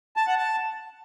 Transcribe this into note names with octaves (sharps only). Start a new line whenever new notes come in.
A5
F#5
A5